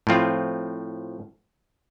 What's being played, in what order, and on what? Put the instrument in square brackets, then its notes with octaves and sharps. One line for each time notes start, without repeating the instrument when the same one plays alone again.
[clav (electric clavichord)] A2 F3 C4 F4